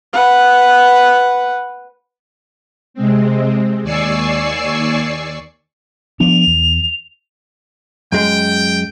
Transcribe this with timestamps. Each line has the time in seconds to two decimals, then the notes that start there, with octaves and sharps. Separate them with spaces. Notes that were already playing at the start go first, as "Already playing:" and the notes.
0.13 B4 F#5
2.94 C3 G#3 C4
3.83 D#2 D5 G#5 C#6 E6 C7
6.20 F3 B3 D4 F7
6.47 E2
8.12 F#2 G#3 G5